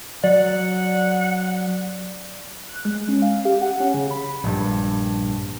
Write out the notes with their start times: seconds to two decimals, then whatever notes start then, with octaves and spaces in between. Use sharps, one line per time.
0.24 F#3 D5 F#5
2.69 F#6
2.85 G#3
3.08 C#4
3.22 F5
3.45 G4
3.62 F#5
3.80 C#4
3.94 C#3
4.11 B5
4.44 A#1 G2